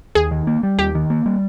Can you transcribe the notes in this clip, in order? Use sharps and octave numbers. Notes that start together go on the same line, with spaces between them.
D#2 G#4
D#3
A#3
G3
D#2 G4
D#3
A#3
G3